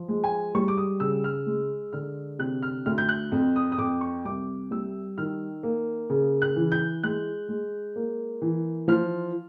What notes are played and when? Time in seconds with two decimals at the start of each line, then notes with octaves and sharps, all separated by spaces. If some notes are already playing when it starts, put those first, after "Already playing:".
Already playing: F3
0.08 G#3
0.24 G#5
0.55 G3 C#6
0.68 D6
0.77 D#6
1.00 C#3 E6
1.24 F6
1.46 G#3
1.93 D3 F6
2.39 C3 F#6
2.62 F6
2.86 D2 F6
2.98 G6
3.09 F#6
3.32 F2
3.56 D#6
3.72 D#6
3.78 F2 D6
4.01 C#6
4.25 C2 D6
4.71 G3 E6
5.18 D#3 F6
5.63 A#3
6.10 C#3
6.42 F#6
6.56 E3
6.72 G6
7.03 G#3 F#6
7.49 G#3
7.96 A#3
8.42 E3
8.88 F3 F6